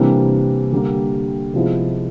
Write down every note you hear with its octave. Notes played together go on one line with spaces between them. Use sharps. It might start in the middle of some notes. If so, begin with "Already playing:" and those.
Already playing: C3 E3 G3 A#3 D4
D3 G3 A#3
C3 F3 G#3 B3 E4